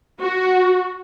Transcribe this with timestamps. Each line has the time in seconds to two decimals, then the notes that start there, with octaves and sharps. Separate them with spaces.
0.20 F#4